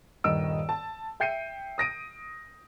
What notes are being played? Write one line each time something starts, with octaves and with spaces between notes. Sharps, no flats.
D#1 G2 D#3 D#5 E6 D7
A5
E5 G5 G6 C7 C#7 D#7
D#6 A#6 D7 D#7